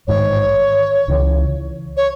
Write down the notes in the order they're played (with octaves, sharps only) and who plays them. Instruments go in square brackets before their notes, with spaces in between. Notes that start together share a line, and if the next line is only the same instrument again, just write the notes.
[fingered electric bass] A1 G#2 D#3 [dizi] C#5
[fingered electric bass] C#2 C#3 E3
[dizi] C#5